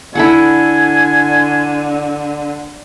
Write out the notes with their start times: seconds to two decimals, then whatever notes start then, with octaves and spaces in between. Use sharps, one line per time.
0.15 D3 E4 A4 F#5 G#5